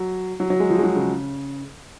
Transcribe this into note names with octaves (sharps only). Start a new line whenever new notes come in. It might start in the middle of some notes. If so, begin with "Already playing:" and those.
Already playing: F#3
F#3
F#3
G#3
F3
G#3
F#3
C#3